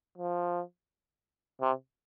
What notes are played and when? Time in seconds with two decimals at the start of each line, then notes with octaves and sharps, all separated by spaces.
0.18 F3
1.61 C3